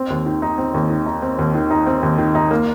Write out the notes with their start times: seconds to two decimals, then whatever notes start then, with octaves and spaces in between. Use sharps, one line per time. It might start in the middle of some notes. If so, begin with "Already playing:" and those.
Already playing: C4
0.10 D#2
0.26 D#3
0.42 D#4
0.58 C4
0.74 D#2
0.90 D#3
1.06 D#4
1.22 C4
1.39 D#2
1.55 D#3
1.71 D#4
1.86 C4
2.03 D#2
2.18 D#3
2.35 D#4
2.51 A#3